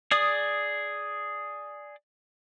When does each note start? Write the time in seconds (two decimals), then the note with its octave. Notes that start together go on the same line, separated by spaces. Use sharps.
0.11 G#4 D5 D#6